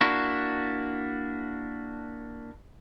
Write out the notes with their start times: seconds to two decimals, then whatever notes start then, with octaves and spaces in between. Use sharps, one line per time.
0.01 A#3 D4 E4 F#4